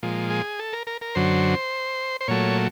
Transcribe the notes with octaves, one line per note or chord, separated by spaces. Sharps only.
A#2 F3 G#3
G#4
A4
A#4
A#4
A#4
F#2 D3 F#3 C5
C5
A#2 F#3 A3 C#5